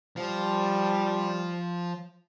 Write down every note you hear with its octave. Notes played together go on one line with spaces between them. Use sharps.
F3 G3